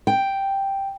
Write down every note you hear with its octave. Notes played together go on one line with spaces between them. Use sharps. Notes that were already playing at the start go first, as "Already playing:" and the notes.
G5